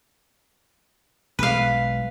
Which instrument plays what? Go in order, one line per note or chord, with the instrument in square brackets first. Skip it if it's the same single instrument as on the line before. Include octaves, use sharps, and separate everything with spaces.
[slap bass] B1 G#3 [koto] B4 F5